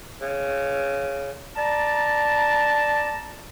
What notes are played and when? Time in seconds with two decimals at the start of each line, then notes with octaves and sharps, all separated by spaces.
0.21 C#3
1.57 D5 A5 A#5